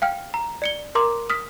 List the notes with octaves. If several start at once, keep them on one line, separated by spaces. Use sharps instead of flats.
F5 G5 F6
A#5
D5 C#7 G7
A#4 A#5 C6 D6
D#6 F6 B6